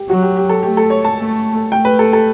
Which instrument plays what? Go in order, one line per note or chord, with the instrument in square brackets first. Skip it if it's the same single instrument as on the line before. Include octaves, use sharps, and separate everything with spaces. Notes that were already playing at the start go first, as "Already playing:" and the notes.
Already playing: [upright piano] G4
[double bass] F#3 [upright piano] F#4
[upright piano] G4
G4
A4
[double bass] A3 [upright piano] G4
[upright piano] A4
C#5
A5
[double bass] A3
[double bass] A3 [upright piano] G5
[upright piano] B4
A4
A4